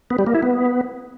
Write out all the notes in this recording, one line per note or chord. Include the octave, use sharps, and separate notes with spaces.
B3
G3
A#3
E4
B3